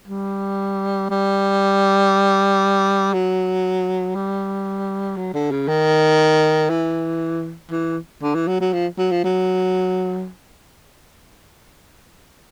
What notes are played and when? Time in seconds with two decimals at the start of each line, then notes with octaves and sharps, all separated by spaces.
0.08 G3
1.10 G3
3.14 F#3
4.15 G3
5.17 F#3
5.34 D3
5.52 C#3
5.68 D#3
6.70 E3
7.71 E3
8.22 D3
8.35 E3
8.48 F#3
8.61 F#3
8.74 F3
8.98 F#3
9.12 F3
9.24 F#3